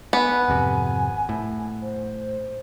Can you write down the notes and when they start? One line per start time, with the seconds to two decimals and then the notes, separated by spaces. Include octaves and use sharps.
0.13 B3 G#5
0.48 G#1 F2 C3
1.29 A2
1.82 C5